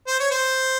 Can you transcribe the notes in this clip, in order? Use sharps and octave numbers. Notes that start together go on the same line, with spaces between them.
C5
C#5
C5